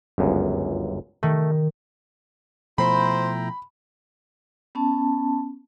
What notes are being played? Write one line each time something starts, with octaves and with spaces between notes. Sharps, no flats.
G1 C#2 F#2
D#3 A3
B2 F3 A3 E4 C5 G5 A#5 B5
B3 C#4 A5